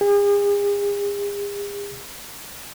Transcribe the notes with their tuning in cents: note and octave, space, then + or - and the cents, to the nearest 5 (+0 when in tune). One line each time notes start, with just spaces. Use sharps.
G#4 -40